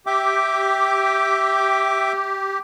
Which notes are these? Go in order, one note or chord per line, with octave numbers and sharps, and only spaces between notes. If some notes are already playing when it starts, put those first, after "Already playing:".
G4 E5 G5 D6